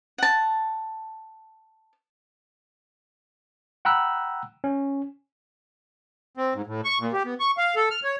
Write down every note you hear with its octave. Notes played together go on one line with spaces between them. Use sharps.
F#5 A5
F#5 G5 A#5 B5 E6 F#6
C#4
C4
G#2
A2
C#6
A#2
G4
B3
C#6
F5
A4
F6
C#5